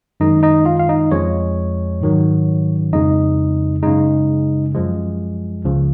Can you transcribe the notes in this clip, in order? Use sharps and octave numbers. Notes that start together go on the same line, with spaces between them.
F#2 D#3 G#3 D#4 D#5
D#4 D#5
F4 F5
F5
D#4 D#5
F2 F3 G#3 C#4 C#5
G#2 D#3 F#3
F2 C#3 G#3 D#4 D#5
F#2 C#3 G#3 D#4 D#5
F#2 F3 G#3
C#2 C#3 F3